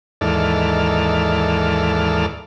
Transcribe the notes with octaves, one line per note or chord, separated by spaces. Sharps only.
D#2 G#2 E3 A4 D5 F6